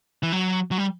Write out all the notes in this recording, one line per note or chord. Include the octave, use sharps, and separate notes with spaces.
E3
F#3
F#3
G3